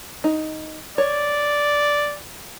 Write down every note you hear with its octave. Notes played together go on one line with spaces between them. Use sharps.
D#4
C#5 D5